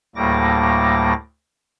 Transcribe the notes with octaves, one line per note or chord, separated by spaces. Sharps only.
D2 A2 G3 A#3 D6 A#6